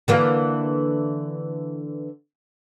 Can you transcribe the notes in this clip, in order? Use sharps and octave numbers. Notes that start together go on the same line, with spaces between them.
D3 E3 A#3